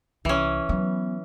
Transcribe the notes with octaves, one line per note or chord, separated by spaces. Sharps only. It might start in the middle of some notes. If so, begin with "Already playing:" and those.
C2 E3 C#4
F#3 B3